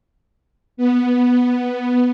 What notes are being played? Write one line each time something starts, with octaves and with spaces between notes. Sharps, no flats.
B3